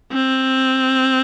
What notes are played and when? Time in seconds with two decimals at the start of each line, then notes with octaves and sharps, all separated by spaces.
0.12 C4